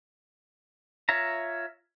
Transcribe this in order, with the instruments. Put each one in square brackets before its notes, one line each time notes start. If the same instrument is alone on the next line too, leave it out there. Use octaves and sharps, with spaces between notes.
[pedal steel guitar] F4 C#5 E5 A#5